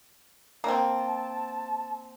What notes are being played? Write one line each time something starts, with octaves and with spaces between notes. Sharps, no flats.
A#3 C4 A5